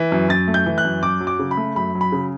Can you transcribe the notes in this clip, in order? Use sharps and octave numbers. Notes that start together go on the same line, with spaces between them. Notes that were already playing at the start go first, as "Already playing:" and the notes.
Already playing: E3
F#2
F#2 A6
A3
G6
E3
F#6
F#2
F#2 D6
F#3
D6
C#3
B5
A3
F#2 B5
F#3
B5
C#3